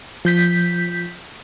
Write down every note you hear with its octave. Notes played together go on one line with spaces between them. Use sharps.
F3 G6 B6